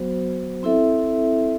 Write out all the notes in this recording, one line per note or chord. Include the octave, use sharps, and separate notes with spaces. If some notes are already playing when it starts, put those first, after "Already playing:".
Already playing: F#3 B3 F#4 C5
C4 E4 A4 E5